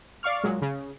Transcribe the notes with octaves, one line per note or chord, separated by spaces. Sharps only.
D5 F5 C#6 F6
A#2 F#3 G#3
C#3